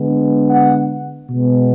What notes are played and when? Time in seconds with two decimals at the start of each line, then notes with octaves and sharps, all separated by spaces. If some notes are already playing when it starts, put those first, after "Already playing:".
Already playing: D3 G#3 B3
0.48 F#5
1.28 B2 G#3 B3